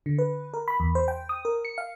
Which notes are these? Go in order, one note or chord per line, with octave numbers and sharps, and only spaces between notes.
D3
B4
A#4
B5
E2
C5
G5
D#6
A#4
C#7
F5